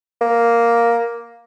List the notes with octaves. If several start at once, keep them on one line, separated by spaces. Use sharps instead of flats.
A#3